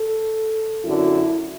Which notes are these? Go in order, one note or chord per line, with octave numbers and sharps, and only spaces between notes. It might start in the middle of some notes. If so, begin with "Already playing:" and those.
Already playing: A4
F#2 D3 F#3 E4